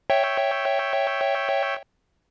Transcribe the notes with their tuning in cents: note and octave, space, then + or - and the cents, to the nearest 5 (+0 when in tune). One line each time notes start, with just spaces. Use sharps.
C#5 +0 E5 +0 G5 +0